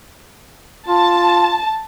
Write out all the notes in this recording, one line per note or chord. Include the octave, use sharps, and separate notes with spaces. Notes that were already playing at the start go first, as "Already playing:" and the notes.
F4 A5